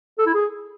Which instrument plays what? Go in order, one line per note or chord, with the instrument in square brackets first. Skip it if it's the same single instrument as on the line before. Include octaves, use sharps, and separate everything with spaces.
[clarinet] A4
E4
G#4